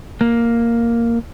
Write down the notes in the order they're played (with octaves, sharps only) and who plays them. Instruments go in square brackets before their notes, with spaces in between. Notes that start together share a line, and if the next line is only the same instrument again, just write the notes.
[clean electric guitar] A#3